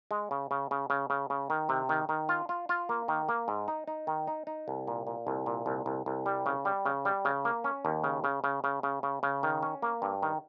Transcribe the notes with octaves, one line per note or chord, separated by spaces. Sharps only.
G#3
C#3
C#3
C#3
C#3
C#3
C#3
D#3
C3
D#3
D#3
F4
F4
F4
A#3
D#3
A#3
G#2
D#4
D#4
D#3
D#4
D#4
C2
A#2
A#2
C2
A#2
C2
C2
C2
G3
C#3
G3
C#3
G3
C#3
A#3
C#4
D#2
C#3
C#3
C#3
C#3
C#3
C#3
C#3
D#3
C#4
A#3
G2
D#3